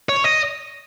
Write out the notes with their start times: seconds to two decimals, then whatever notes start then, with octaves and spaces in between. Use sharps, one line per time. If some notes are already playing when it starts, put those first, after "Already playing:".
0.09 C#5
0.24 D#5